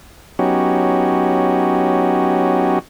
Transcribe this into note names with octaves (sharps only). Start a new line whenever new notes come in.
F#3 B3 C#4 D#4 F#4 G4